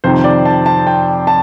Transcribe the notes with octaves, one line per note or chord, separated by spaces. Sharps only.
F2 C3 D#3 C5
D5
A5
A5
G5
A5